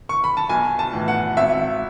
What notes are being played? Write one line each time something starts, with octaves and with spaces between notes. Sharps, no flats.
C#6
B5
A5
B1 G#5
A5
A2 E3 B3
F#5
G#1 E5